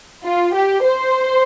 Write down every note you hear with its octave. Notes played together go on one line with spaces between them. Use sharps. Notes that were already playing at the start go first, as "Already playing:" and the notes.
F4
G4
C5